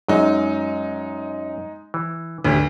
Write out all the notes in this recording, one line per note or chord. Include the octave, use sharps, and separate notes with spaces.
F#2 F#3 G#3 D#4
E3
A1 D2 E4 G4